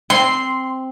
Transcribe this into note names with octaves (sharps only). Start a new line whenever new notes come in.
C4 C6